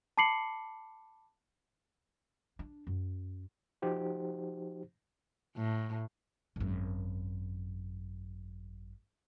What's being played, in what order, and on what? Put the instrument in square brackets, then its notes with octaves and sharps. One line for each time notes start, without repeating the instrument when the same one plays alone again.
[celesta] A5 B5 D6 C7 C#7 F#7
[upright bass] D4
F#2
[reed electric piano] F3 D#4 F#4 G4 C5
[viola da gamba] A2
[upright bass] G#1 F#2